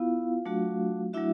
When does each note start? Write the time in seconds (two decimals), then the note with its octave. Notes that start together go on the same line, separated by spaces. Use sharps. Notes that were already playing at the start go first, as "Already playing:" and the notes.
Already playing: B3 E4 F4 F5
0.45 F#3 A3 D4 F#4
1.13 F#3 A3 D4 E4 F#4 E5